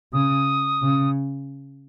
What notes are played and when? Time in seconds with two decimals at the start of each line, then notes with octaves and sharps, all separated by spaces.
0.13 C#3 D#6
0.83 C#3